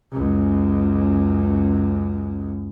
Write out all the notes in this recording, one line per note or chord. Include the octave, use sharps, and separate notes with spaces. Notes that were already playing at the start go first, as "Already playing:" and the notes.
C#2 F#2